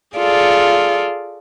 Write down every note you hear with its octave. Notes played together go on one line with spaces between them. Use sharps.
F4 G#4 A4 D5